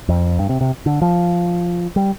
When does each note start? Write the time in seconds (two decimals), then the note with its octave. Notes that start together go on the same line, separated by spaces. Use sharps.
0.09 F2
0.39 G2
0.49 C3
0.61 C3
0.86 D3
1.02 F3
1.96 G3